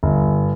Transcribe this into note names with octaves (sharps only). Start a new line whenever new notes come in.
G1